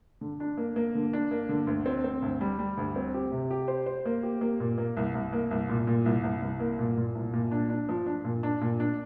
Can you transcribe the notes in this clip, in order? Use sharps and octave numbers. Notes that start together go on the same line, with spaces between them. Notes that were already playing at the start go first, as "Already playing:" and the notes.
D3
D4
A#3
A#3
D3
D4
A#3
D3
D2
C4
C4
D2
G3
G3
D2
C4
G4
C3
G4
C5
C5
A#3
G4
A#3
A#2
A#3
C2
C2
A#3
C2
A#2
A#2
C2
C2
C2
A#3
A#2
A#2
C2
A#2
D4
D4
F3
D4
A#2
D4
A#2
D4